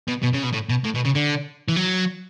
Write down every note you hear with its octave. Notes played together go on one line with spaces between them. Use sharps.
B2
B2
C#3
B2
A2
B2
A2
B2
C#3
D3
E3
F#3